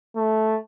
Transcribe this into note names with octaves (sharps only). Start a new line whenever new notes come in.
A3